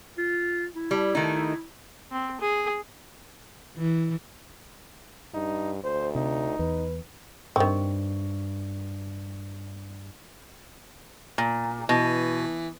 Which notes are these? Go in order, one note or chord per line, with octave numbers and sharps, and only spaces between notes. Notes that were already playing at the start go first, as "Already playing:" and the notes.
F4
E4
G3
D#3 A3 D#4
C4
G#4
E3
G2 D#4
D2 C5
C3 D#4
E2 B4
G2 D#3 C4 C#6
A#2
B2 E3